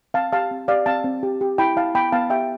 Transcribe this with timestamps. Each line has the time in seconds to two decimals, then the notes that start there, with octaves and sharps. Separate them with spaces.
0.14 C4 F5 A5
0.32 G4 F5 A5
0.51 C4
0.68 G4 D5 F5
0.86 C4 F5 A5
1.04 C4
1.23 G4
1.41 G4
1.58 E4 G5 B5
1.76 E4 F5 A5
1.95 B3 G5 B5
2.12 B3 F5 A5
2.30 G4 E5 G5